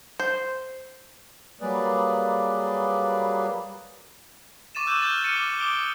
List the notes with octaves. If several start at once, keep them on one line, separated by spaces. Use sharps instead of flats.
C5
F#3 G3 A#3 G#4 B4 D5
C#6 D6 A6 D#7 E7
D6 E6 F#6 G6 D#7
C#6 F6 G6 A6
F6 A6 C#7 D#7
D6
D6 D#6 D7 G7